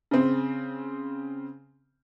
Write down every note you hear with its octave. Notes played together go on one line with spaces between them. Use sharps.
C#3 C4